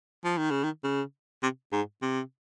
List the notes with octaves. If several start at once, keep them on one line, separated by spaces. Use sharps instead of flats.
F3
D#3
C#3
D#3
C#3
C3
G#2
C3